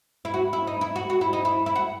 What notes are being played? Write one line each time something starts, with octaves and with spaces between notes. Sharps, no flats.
E4
F#4
E4
D#4
E4
F#4
F#4
E4
D#4
E4
E4
F#4